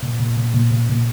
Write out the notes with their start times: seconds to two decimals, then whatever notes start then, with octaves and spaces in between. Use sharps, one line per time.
0.03 A#2
0.20 A#2
0.37 A#2
0.54 A#2
0.71 A#2
0.89 A#2